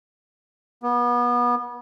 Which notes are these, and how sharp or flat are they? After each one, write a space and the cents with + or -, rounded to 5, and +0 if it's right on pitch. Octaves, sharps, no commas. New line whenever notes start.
B3 -30